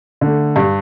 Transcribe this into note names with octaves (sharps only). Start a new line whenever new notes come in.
D3 A3
G2